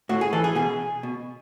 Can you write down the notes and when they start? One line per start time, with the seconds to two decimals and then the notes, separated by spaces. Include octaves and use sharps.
0.09 A2 F#4
0.21 G#4
0.33 E3 A4
0.44 G#4
0.55 B2 G#4
1.03 B2